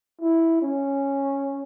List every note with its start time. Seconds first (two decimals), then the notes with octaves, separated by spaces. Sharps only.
0.21 E4
0.62 C#4